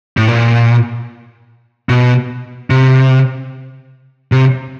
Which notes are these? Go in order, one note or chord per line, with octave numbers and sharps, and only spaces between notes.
A2
A#2
B2
C3
C3